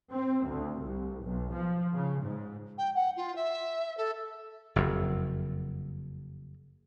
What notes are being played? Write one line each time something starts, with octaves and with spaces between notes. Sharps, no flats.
C4
D2
C2
B1
F3
C#3
G#2
G5
F#5
F4
E5
A4
F#1 F2